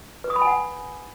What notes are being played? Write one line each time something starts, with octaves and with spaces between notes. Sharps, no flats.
B4
D#6
B5
G#5
F#5